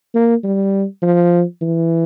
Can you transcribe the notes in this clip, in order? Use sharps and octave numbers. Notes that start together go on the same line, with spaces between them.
A#3
G3
F3
E3